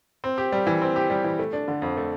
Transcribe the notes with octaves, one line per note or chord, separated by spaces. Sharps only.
C4
G4
G3
E3
C4
G4
G3
E3
A3
D4
D3
F2
A3